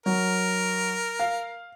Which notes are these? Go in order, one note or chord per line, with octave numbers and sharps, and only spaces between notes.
F#3 A#4
F5